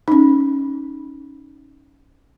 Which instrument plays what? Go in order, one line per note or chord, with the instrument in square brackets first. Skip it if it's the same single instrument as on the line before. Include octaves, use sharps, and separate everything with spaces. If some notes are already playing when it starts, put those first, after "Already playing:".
[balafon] C#4 D#4